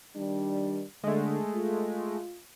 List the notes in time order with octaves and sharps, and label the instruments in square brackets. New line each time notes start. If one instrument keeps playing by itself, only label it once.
[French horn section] D#3 G3 D4
[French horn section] D3 [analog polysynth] G#3 A3
[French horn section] F4